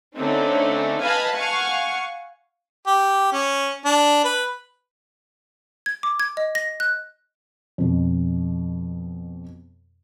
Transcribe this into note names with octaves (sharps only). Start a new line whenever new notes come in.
D3 A3 C4 C#4 D#4
B4 D#5 F5 G#5 A5 B5
F5 F#5 G#5 C#6
G4
C#4
D4
B4
G#6
D6
G#6
D#5
A#6
F#6
F2 B2